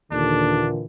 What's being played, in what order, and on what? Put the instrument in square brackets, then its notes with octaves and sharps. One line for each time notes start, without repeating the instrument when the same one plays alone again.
[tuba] D#2 [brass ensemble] A#2 D3 E3 [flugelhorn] D4